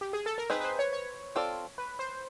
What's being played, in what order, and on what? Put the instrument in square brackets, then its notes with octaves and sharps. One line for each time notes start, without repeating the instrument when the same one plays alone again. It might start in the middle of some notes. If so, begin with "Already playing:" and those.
[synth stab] G4
G#4
A4
A#4
[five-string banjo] C4 D#4 G#4 [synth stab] B4
[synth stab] B4
C5
C#5
C#5
[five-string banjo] C4 F4 A4 D5
[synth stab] B4
C5